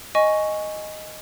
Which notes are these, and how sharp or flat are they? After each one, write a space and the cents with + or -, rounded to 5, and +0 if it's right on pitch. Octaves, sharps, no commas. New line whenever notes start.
D#5 +0 G#5 +0 C#6 +0